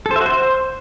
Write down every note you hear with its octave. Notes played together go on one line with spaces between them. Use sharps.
A4
C5
E5
F#4
C5